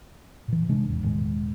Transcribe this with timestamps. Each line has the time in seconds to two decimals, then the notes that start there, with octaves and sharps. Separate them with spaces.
0.48 A#2 E3
0.69 C3 G#3 D4
0.86 G#1 E2
1.03 E1 A2 D#3 G#3